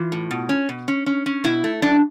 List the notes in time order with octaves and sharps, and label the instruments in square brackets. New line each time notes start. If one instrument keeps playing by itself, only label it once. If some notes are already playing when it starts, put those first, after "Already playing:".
Already playing: [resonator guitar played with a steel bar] E3 F4
A2
B2
C#4
B2
C#4
C#4
C#4
B2 E4
A3
F#2 D4